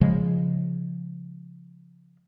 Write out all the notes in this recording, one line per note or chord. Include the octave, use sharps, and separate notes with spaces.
C#3 F3 G#3